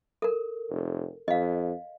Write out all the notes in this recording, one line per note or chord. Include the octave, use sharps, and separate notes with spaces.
A4 A#4
F1
F2 D#5 F5